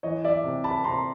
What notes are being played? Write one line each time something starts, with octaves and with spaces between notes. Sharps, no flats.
E3 C#5 D#5
D5 E5
C3
A5 B5
C3 A#5 C6